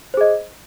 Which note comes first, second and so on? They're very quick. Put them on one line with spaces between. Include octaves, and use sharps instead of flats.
C5 G#4 D#5